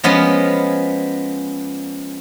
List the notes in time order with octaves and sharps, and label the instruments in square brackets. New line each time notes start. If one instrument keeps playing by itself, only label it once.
[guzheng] F3 G#3 B3 C#4